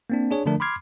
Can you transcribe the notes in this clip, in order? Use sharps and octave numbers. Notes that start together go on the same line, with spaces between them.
A#3 C4 D4
D4 G#4 C#5
D3 F3 A3 D4 A#4
B5 C6 D6 F6 G#6 C7